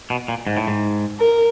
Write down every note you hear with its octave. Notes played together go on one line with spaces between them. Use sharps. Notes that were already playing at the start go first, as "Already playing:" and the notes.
B2
A#2
G#2
A2
G#2
A#4